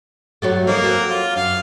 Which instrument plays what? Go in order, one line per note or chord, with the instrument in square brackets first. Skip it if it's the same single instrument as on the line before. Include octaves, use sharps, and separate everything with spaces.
[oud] F#3 G3 A3
[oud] F3 D#4 [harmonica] A#3
[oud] F#3 C4 A4
[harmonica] F4
[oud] F#2 [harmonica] F5